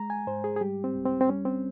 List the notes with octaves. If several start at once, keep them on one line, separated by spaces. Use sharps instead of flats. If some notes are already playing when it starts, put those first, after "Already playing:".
Already playing: G#3 A#5
G#5
G#2 C5
G#4
G#4
G3 G4
C4
C2
C4
C4
G3 C#4
C4